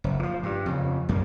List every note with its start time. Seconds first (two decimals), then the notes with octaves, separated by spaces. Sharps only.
0.04 F#1
0.19 E3 F3
0.43 G2
0.66 F2 C#3
1.09 C2 F#2 A#3